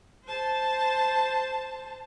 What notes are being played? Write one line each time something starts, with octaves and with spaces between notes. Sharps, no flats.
C5 A5